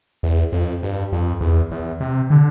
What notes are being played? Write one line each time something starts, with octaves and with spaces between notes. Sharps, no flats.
E2
F2
G2
F2
E2
E2
C3
D3